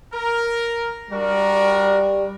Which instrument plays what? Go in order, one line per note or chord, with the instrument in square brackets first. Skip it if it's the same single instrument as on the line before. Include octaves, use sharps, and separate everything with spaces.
[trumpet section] A#4
[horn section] G3 [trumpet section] D4 F#4 A#4